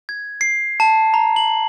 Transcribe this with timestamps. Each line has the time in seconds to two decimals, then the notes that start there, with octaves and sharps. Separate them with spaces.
0.09 G#6
0.41 C7
0.80 A5
1.14 A#5
1.36 F#7